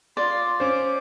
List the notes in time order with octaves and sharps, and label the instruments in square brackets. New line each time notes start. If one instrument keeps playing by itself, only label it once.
[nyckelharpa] F4 C6 [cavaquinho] D5
[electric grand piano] C#4 C5 [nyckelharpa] D6